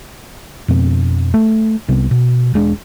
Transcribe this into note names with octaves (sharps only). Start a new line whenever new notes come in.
F2 B2 C4
A3
C2 C3 G3 B3
B2
E1 G#3 D4